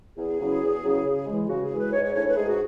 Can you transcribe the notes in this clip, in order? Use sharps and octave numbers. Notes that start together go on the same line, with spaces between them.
E2 G#4
C#3 F#3 C#4 E4
E2
C#3 F#3 C#4 E4
C#3
E3 G#3
C#3 F#4
G#4
E3 G#3
B4
G#2 C#5
C#5
E3 A3 D4 C#5
B4
G#2 G#4
F#4